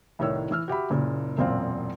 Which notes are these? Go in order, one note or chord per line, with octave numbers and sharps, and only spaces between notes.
C2 A2 D#3 C#5 E6
E3 E6 F6
F#4 G4 E5 B5
F#1 A#2 C#3
E1 F#2 A#2 C4 F5